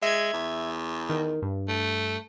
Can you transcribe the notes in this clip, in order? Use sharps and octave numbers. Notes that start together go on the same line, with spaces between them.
G#3 E5 G#6
E2
D#3
G2
A3